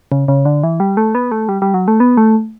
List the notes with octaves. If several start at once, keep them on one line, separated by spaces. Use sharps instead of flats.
C#3
C#3
D3
E3
G3
A3
B3
A3
G3
G3
F#3
A3
B3
A3